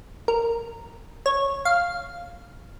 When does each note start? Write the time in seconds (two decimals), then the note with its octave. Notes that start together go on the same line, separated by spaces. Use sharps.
0.28 A#4
1.26 C#5
1.65 F5